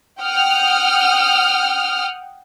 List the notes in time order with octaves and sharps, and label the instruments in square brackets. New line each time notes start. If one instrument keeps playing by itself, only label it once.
[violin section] F#5 G5 D#6 F6